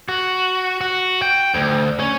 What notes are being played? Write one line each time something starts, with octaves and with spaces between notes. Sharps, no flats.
F#4
F#4
G5
D2
C#4